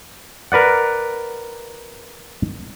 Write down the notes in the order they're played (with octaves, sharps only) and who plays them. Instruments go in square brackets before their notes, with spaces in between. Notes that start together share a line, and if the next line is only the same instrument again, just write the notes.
[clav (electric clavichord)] A#4 B4 D5 F#5